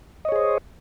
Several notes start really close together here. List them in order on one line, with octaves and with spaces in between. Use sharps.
D#5 C#5 G#4 C5